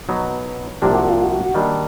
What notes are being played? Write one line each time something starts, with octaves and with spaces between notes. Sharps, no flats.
B2 F#3 B3 D#4
C2 C3 F3 A#3 D4 G4
F#4
F4
F#4
D#3 G3 A#3 D4